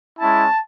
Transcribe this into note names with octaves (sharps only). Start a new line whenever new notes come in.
G#3 C#4 E4 A5